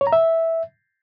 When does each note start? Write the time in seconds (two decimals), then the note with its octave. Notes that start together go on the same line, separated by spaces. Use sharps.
0.01 C#5
0.07 A#5
0.13 E5